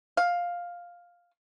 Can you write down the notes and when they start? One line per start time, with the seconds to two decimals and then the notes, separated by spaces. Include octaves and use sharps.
0.17 F5